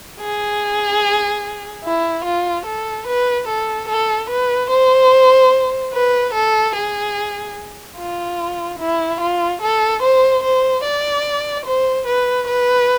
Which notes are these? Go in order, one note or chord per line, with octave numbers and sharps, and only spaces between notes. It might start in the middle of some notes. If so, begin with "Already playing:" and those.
G#4
E4
F4
A4
B4
A4
A4
B4
C5
B4
A4
G#4
F4
E4
F4
A4
C5
C5
D5
C5
B4
B4